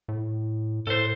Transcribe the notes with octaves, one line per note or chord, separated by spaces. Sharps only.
A2
A2 A4 C5